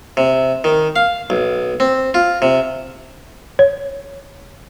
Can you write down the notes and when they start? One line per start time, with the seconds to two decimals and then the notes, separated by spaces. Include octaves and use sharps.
0.17 C3
0.64 D#3
0.96 F5
1.30 B1
1.80 C4
2.14 F4
2.42 C3
3.59 C#5